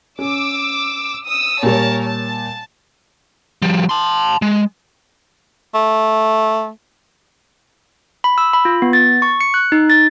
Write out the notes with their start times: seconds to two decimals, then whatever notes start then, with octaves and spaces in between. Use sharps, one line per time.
0.19 C#4 D6 E6
1.26 D#6 E6
1.63 A#2 G3 A#4 C#5 A5
2.03 A5
3.62 F3 G3
3.89 A5 C6
4.42 G#3
5.74 A3
8.24 B5
8.38 E6
8.53 B5
8.65 F4
8.82 B3
8.93 A6
9.22 C#6
9.41 C#7
9.54 F#6
9.72 D#4
9.90 A6